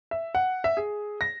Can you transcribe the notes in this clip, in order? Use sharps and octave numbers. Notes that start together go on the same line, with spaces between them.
E5
F#5
E5
G#4
A#6